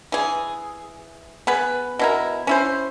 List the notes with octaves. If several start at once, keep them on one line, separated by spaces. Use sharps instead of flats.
E3 G#4
B3 G#4 B4
B2 E4 A#4
C#4 E4 C5